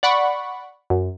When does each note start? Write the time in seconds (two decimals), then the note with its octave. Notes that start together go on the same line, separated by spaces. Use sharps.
0.03 D5 F#5 B5 C#6
0.90 F#2